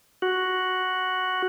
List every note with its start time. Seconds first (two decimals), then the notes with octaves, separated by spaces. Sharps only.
0.22 F#4